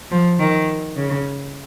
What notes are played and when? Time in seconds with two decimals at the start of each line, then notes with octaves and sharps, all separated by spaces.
0.11 F3
0.39 D#3
0.96 C#3